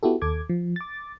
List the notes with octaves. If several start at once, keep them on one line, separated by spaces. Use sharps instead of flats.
B3 E4 F#4 G4 A4
D#2 A4 D6 G#6
F3
D6 A6